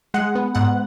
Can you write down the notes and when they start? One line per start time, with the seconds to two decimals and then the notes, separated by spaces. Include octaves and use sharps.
0.14 G#3 F#5
0.35 B3
0.55 G#2 F#5